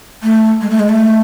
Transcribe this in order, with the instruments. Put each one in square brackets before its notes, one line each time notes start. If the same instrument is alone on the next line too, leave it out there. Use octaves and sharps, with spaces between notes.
[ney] A3
G#3
A3
G#3
A3